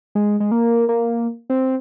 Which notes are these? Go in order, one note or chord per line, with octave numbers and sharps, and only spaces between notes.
G#3
G#3
A#3
A#3
C4